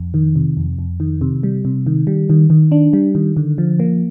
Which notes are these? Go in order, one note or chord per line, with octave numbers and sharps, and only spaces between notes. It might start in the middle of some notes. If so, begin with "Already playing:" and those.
Already playing: F2
D#3
C3
F2
F2
D#3
C3
G3
C3
D#3
G3
D#3
D#3
D4
G3
D#3
D3
F3
A#3